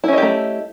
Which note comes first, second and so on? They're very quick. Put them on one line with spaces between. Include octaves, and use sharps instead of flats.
E4 C#4 D#5 G4 A3